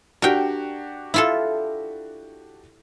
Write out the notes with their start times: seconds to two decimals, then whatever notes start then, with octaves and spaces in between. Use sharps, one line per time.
0.22 D4 F#4 G4 A#4 G5
1.14 E4 F4 A4